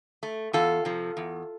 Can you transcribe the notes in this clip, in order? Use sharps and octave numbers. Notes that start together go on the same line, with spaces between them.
A3
E2 F4 A4
C3 F3
E2